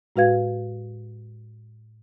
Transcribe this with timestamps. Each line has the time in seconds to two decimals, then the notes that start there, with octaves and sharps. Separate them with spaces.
0.16 A2 G#3 F#4 B4 F5 G#6